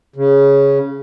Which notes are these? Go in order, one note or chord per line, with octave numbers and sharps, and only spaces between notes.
C#3